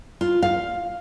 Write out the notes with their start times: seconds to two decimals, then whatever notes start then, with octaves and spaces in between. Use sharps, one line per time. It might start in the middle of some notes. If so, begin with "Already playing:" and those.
0.21 F4
0.43 F5